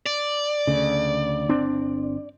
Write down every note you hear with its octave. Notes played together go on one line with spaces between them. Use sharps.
D5
D2 C#3
G1 C4 D4